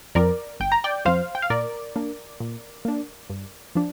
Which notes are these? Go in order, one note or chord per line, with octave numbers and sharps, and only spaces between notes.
F2 F3 C4 A#4 D5
G1 G5
A#5
D5 G5
F2 F3 C4 C5 F5
G5
F5
A#2 A#4 D5
A#3 D4
A#2
A#3 D4
G2
F3 D4